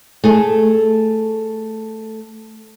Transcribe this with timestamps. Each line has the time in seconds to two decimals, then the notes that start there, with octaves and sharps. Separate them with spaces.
0.24 A3 G#4 A4